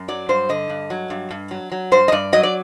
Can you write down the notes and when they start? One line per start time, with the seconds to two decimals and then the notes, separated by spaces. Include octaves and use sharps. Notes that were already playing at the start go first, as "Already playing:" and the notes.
Already playing: F#2
0.08 F#3 D5
0.29 G2 C5
0.49 D3 D#5
0.70 G2
0.90 F#3
1.10 G2
1.31 G2
1.51 F#3
1.72 F#3
1.92 G2 C5
2.08 D#5
2.12 G2 D5
2.33 F#3 D#5
2.43 D5